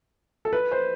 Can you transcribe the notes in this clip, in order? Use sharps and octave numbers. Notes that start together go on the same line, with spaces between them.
A4
B4
C5